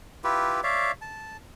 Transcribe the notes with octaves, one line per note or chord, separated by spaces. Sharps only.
E4 F4 G4 B4
C#5 D5 E5 F5
A5